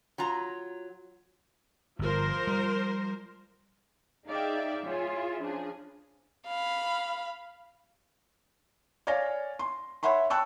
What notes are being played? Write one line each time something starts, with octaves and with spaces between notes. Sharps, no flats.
F#3 F4 A#5
G1 F3 A#4 C5
G3
D#4 G#4 D5 E5 F5 G5
F4 G#4 C#5 E5 G#5
C#3 F3 D4 G#4
F5 B5
C#5 D5 F5 G#5 A#6
C6
C#5 E5 F#5 B5 C6
G5 A5 C#6 E6 F#6